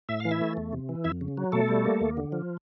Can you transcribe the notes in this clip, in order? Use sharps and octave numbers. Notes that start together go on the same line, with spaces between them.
A2 E5
E3 F5
E4 E5
A3
E2
C3
E3
F2 E4 E5
C#3
F#3
B2 A3 A4
G3
A#3
D#2
D3
F3